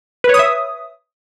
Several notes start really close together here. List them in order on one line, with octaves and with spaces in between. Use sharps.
B4 C#5 D#6 E5